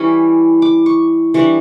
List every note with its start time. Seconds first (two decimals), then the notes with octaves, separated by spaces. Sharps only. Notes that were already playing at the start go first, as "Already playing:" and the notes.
Already playing: E3 G3 C#4 E4 C#6
0.62 D6
0.86 C#6
1.34 E3 G3 D4 C#6